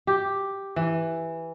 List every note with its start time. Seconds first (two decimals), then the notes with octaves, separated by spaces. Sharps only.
0.07 G4
0.76 E3